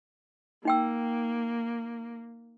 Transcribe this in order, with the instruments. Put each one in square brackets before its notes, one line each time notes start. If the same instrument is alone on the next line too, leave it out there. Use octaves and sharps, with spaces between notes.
[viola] A#3 [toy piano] D#4 G5 E6